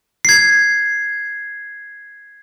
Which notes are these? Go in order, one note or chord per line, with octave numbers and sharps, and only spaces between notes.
G#6 C7